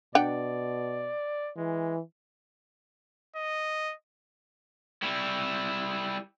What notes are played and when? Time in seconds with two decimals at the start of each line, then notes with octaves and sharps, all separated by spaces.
0.15 B2 D4 D5 F#5 G5
1.57 E3 G#3
3.36 D#5
5.03 G3 E4